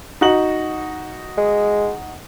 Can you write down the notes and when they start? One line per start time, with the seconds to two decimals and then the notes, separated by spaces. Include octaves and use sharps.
0.21 D#4 F#4 F#7
1.38 G#3